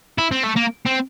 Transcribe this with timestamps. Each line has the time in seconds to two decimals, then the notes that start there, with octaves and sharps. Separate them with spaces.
0.18 E4
0.31 C4
0.43 A3
0.56 A#3
0.86 C4